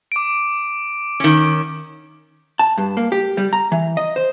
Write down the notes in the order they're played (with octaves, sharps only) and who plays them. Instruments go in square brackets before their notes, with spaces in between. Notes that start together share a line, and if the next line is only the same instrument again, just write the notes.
[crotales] D6 D7
[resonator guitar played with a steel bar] D#3 C#4
[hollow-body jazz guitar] A5
G2
A#3
G4
G3
A#5
E3
D#5
C5